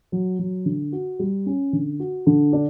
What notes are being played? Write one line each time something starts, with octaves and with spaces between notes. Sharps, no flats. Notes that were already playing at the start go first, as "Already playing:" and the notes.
F#3
F#3
D3
F#4
G3
C#4
D3
F#4
D3
D4